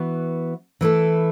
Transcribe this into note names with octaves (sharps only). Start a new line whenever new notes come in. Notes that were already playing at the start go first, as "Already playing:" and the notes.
Already playing: E3 B3 F#4
E3 A3 E4 A4